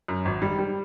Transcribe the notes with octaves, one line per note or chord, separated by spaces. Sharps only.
F#2
G#1
G3
G3